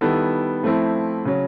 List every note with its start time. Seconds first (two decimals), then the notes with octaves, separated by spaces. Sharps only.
0.01 D#3 G3 B3 E4 A4
0.63 F3 A3 C4 E4
1.25 C#3 F#3